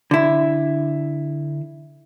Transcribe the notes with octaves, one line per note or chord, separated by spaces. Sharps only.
D3 E4